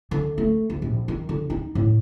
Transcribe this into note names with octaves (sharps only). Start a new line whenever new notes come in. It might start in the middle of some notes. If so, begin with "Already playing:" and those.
D3
A3
D2
A#1
D#3
D3
D#4
A2